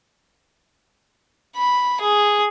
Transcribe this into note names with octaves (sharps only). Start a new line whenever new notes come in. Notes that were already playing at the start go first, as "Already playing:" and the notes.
B5
G#4